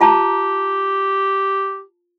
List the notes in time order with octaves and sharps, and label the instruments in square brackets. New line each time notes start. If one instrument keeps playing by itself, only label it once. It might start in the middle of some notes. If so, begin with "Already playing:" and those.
[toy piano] F4 A5 A#5 [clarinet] G4